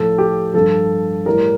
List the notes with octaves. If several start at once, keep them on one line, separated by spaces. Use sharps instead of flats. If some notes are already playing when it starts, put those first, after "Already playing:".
Already playing: A2 F3 A4
G4
G2 F3 A4
A2 E3 G3 A#4